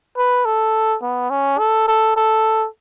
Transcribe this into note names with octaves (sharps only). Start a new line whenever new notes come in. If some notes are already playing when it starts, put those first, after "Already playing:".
B4
A4
B3
C#4
A4
A4
A4